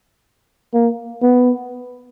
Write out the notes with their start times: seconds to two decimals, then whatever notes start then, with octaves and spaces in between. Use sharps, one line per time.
0.74 A#3
1.22 B3